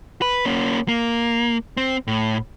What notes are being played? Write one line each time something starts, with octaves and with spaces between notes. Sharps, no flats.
B4
A#3 C#4
A#3
C4
A2